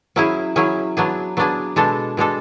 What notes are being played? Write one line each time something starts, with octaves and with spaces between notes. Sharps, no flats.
F#3 C#4 E4 G#4
F#3 C#4 E4 G#4
F#3 B3 D4 G#4
F#3 B3 D4 G#4
B2 G#3 D4 A4
B2 G#3 D4 A4